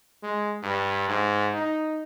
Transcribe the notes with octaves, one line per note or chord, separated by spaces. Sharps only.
G#3
G2
G#2
D#4